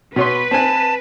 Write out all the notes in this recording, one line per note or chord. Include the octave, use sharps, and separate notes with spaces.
B2 B4 C#5 C6
C4 G#5 A5